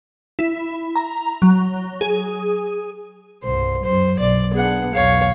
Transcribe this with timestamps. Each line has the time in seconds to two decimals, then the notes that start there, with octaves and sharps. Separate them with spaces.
0.39 E4
0.96 A#5
1.42 F#3
2.01 G#4
3.43 C2 G2 C5
3.84 F#2 F#3 C5
4.19 B1 D5
4.53 B3 D4 G#4 F#5
4.94 B1 E2 C#5 F5